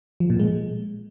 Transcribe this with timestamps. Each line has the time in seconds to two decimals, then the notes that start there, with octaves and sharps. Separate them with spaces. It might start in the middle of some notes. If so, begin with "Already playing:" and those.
0.20 F3
0.30 A#2
0.40 G#3